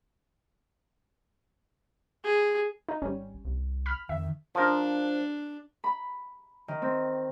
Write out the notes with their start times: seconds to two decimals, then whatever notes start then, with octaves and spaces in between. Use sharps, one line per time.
2.24 G#4
2.89 D#4
3.02 G#1 G3 C#4
3.45 C2
3.86 B5 F6
4.09 F2 D#3 E5
4.55 F3 D4 A#4
5.84 B5
6.68 D#3
6.82 C4